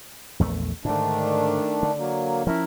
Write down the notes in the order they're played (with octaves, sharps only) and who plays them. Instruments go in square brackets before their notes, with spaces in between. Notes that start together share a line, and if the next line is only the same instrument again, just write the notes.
[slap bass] A#1 E2 A3
[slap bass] G#2 D3 [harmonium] D#3 A3 D4
[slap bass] D3
[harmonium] F#3 A#3
[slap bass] F3 C#4 [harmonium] E4 A#4